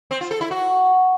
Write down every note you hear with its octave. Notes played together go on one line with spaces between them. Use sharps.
C4
F4
A4
E4
F#4